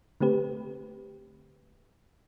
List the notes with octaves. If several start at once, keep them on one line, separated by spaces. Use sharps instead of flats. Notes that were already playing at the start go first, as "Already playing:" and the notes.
D3 A3 C4 G4 B4